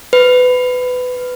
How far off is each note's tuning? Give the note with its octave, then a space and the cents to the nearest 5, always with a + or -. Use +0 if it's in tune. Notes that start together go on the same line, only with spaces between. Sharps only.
B4 +20